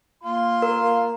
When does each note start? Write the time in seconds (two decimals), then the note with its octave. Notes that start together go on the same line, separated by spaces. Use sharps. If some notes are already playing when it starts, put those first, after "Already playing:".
0.24 A#3 F4 C6
0.62 A#4